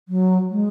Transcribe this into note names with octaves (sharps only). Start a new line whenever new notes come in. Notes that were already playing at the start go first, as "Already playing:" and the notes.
F#3
G#3